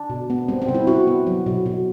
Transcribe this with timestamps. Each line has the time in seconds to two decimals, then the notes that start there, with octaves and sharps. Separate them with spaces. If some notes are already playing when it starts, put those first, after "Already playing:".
Already playing: D4
0.10 B2
0.30 B3
0.48 G3 C4
0.62 C4
0.68 C3
0.75 E4
0.87 C3 F#4
1.07 B3
1.27 F#3
1.46 B2
1.66 B2